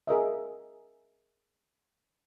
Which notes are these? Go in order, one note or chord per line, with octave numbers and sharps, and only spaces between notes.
G#4 A#4 D#5 E5